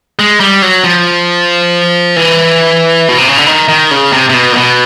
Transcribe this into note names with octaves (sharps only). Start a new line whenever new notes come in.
G#3
G3
F#3
F3
E3
B2
C3
C#3
D3
D#3
D#3
C#3
C3
C3
B2
A#2
B2